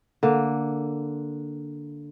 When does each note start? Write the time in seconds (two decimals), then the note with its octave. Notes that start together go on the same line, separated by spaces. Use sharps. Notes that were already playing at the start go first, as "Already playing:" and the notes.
0.23 D3 A#3